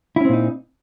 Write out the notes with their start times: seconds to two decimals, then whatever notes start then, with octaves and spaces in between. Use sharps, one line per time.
0.16 E4
0.21 C#4
0.25 C4
0.29 A#2
0.33 D#4